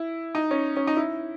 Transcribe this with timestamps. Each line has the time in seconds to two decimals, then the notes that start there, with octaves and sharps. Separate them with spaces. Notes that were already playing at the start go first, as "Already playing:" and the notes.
Already playing: E4
0.35 D#4
0.51 C#4
0.77 C#4
0.87 D#4
0.97 E4